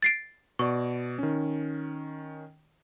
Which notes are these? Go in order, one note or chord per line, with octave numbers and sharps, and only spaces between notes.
A6 C7 D7
B2 D5 C#6
D#3 C#4